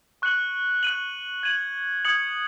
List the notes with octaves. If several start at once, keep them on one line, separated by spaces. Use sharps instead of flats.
C#6 F#6 C#7 F#7
F#6 D#7 F#7
G#6 D#7 F#7
D#6 G#6 C#7 F#7